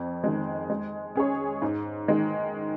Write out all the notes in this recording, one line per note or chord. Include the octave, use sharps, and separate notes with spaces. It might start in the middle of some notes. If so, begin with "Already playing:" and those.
Already playing: F2
D#3 G#3
G#3
C#4 G#4 C#5
G#2
D#3 G#3